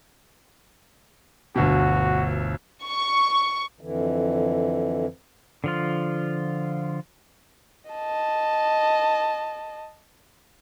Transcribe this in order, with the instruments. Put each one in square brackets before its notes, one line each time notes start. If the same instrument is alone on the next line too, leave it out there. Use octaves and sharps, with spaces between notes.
[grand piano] G1 D2 B2 [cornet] F#4
[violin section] C#6
[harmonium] F2 D3 E3
[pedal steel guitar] D3 F3 F4
[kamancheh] D#5 A5